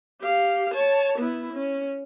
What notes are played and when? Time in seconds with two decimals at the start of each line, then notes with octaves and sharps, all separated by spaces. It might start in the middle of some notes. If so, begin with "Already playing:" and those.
0.21 G4 F5
0.74 C#5 A5
1.18 B3 E4
1.53 C#4